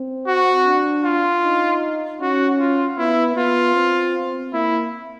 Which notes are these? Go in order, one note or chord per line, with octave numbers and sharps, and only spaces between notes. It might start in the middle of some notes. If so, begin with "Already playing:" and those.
Already playing: C4
F#4
D4
F4
D#4
C#4 F#4
F4
B3 E4
B3 F4
C4
A#3 E4